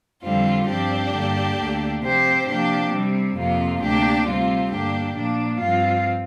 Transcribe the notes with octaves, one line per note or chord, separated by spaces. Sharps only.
F2 D3 G3 C4 F4
G2 F3 C4 D4 G4
G2 D3 A#3
D2 D3 A#3
C3 F3 C4 G4 C5
C3 F3 A#3 D4 G4
C3 G3 C4
F2 C3 A#3 F4
D2 C3 A#3 D4 G4
C3 G3 C4 F4
G2 D3 A#3 D4 G4
A#2 F3 A#3 D4
G2 F3 C4 F4